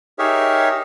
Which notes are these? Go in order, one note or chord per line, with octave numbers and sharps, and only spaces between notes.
D#4 G4 G#4 A#4 C#5 E5